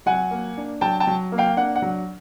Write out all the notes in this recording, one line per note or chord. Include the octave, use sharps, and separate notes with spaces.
F#3 F#5 G#5
A#3
D4
F#3 G5 A5
G5 A5
F#3
A#3
F5 G5
D4 F#5
F#5
F#3